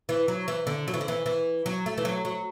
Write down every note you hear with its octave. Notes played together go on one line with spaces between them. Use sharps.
E3
F#3
E3
D3
F#3
E3
D3
E3
E3
F#3
A3
E3
F#3
F#3